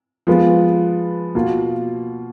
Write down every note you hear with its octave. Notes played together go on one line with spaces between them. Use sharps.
F3 G#3 B3 F4
B2 A#3 F4